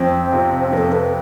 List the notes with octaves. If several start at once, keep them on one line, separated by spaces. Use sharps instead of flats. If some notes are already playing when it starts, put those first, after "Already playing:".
Already playing: F2 C4
C3 F3
F2 A4 B4
B4